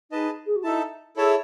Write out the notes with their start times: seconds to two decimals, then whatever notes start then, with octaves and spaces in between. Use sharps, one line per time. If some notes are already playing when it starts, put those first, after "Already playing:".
0.11 D#4 G#4 B4 D#5 A5
0.46 G#4
0.56 F#4
0.63 D#4 E4 A4 E5 A5
1.16 E4 G#4 A4 C#5 E5 A5